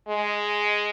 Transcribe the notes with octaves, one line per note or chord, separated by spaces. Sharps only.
G#3